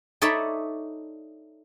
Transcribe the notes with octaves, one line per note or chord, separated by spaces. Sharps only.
D#4 A4 C#5 D5 E5 B5